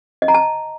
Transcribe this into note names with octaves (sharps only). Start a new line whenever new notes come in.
D#5
A#5
A5